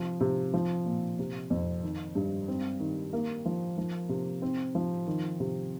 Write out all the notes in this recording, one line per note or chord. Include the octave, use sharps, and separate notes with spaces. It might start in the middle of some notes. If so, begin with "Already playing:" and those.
Already playing: C3 F3
C3
F3
A#2
C3
F2
D#3
G2
C4
D#3
A#3
F3
F3
C3
C4
F3
D#3
C3